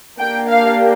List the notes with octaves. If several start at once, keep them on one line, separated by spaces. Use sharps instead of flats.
A#3 D4 G4 G5
F5